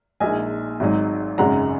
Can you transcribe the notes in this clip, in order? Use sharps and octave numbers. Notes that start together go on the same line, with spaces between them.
A#1 A#2 G#3 D#4 D#5 G#5
G#1 G#2 F#3 D#4
G#1 F#2 C#3 G#3 F#5 A#5